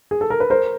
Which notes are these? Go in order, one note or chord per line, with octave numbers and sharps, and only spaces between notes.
G#4
A4
A#4
B4
A#4 C5